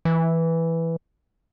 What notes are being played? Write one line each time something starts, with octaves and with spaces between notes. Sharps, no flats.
E3